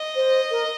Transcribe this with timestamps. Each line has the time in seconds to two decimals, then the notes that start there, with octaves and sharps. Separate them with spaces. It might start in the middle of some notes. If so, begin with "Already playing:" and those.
Already playing: D#5
0.15 C5
0.50 A#4